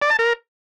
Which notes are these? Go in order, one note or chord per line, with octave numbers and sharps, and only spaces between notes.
D5
A5
A#4